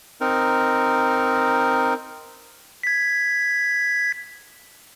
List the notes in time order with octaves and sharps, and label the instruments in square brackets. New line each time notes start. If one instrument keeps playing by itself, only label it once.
[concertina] C4 D#4 A#4
[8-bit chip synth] G#6 B6